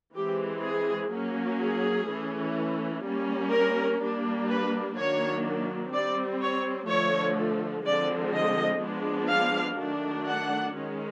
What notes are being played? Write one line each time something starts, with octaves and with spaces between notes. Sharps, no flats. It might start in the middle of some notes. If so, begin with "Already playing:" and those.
E3 G#3 C4 G4
G#4
F#3 A#3 C#4
G#4
E3 A3 C#4
G3 A#3 C#4
A#4
G3 A#3 D4
B4
D#3 F#3 A#3 D4 C#5
G3 C4 D5
C#5
D3 F3 A3 C#5
D3 F3 G#3 C4 D5
D#5
F3 G#3 B3 D4
F5
D#3 F#3 A3 D4
F#5
D#3 G#3 C#4